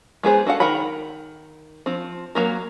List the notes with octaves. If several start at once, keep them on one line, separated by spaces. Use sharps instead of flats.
G#3 B3 G#4 C5
F#4 A4 F5 F#5
D#3 A#4 F#5 G5 B5
F3 C4
F#3 A#3 A#4